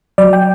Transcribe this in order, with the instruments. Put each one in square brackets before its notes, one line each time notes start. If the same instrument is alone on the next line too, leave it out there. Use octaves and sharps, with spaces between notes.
[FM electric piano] F#3 D5
G5